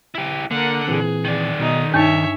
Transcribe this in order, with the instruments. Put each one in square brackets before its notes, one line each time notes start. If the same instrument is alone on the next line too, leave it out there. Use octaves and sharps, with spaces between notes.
[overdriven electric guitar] E4 G4
[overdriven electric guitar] D3 [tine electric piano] A#3 [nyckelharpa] A#4 F#5
[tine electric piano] A#2 E3 C4 [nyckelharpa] G#4
[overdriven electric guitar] D#3 D5
[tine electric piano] B2 B3 [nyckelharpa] D#4 D#6
[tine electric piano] G2 G#5 [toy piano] D4 D#4 [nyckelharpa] C#5 E5